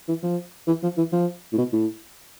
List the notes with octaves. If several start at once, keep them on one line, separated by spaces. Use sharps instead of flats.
E3
F3
E3
F3
E3
F3
A2
B2
A2